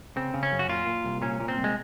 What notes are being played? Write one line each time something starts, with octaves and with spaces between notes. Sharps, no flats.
C#3 C4
C#3
C#4
F#2
F#4
A#2 F4
A#2
C2
A#2 C#4
A#2
C4
C2
G#3